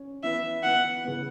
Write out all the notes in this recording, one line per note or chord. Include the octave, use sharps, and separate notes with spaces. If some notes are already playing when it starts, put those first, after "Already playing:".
Already playing: C#4
E3 B3 E4 E5
E3 B3 E4 F#5
C#3 E3 B3